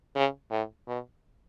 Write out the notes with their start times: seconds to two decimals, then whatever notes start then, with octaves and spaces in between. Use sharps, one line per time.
0.16 C#3
0.51 A2
0.88 B2